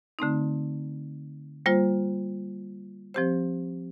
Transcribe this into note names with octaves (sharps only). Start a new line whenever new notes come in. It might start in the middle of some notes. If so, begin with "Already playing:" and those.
D3 A3 C4 D#4
G3 A#3 F4 C5
F3 C4 G4 C5